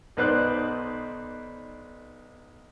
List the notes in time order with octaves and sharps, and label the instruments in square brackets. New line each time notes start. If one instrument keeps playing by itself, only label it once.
[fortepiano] B1 D#4 B4 C5 D5 F#6